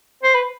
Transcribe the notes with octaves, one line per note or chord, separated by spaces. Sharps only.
C5
B4